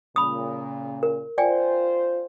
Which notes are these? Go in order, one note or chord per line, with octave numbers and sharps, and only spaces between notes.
A#2 C#3 B5 D#6
A#4
F4 C5 D5 G5 G#5